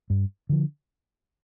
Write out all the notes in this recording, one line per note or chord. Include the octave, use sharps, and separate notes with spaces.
G2
D3 F3